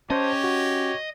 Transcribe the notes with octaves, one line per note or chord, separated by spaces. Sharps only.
C#4 G4 C5 C#5 D#5 A5
F#4